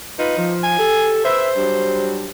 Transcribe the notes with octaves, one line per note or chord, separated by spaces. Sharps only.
D#4 F4 B4
F3
G#5
G4 A4
B4 C5 E5
F#3 G3 D4